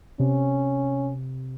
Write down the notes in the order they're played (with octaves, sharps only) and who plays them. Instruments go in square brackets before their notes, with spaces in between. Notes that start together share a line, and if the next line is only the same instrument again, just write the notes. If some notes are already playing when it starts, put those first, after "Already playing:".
[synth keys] C3 [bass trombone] C#4